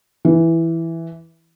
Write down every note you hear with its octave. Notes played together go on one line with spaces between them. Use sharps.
E3